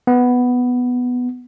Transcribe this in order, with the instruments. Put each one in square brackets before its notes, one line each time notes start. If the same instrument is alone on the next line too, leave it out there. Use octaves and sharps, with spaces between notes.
[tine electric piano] B3